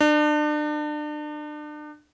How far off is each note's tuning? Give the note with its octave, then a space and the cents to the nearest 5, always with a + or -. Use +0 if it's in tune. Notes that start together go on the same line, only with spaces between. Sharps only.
D4 +35